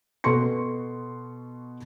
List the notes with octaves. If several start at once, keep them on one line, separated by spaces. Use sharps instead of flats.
B2 B3 A4 C6 C#6 C#7